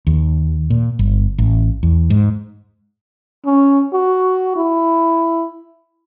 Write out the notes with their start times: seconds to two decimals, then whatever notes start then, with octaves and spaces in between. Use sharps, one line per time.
0.07 D#2
0.70 A#2
0.99 G1
1.38 A1
1.83 E2
2.10 G#2
3.45 C#4
3.93 F#4
4.56 E4